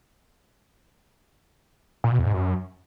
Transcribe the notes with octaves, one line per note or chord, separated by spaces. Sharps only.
A#2
B2
E2
G#2
F#2